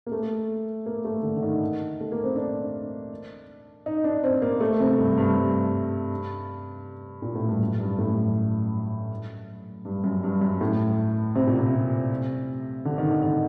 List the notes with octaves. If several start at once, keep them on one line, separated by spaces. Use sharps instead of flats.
A#3
A3
A#3
A3
D3
D3
D#3
A3
A#3
C4
D4
D#4
D4
C4
A#3
A3
C3
G2
G2
G2
A#2
A2
G2
F#2
G2
A2
F#2
G2
F#2
G2
F#2
A2
C3
A#2
C3
D3
D#3
D3
D#3